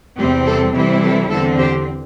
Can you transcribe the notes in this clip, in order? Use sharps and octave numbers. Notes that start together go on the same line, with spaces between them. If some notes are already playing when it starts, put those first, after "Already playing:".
E2 C3 G3 C4 G4
A4
C3 E3 G3 C4 E4 G4
A4
E2 D3 C4 A4
G4 C5